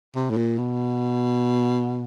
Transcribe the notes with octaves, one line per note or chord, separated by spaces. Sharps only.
C3
A2
A#2
B2